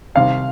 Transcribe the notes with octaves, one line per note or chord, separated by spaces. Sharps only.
C2 C3 D#3 F5